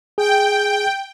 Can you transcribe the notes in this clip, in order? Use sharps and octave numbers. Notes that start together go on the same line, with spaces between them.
G#4 G5